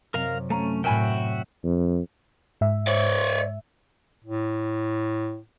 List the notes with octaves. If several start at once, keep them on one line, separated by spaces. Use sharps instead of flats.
F#2 C3 C4 A#4 F5 A#5
A3 C#4 F5 A#5
A2 F#4 A#4 E5 G5 G#5 B5
F2
G#2 E5
C#5 D5
A2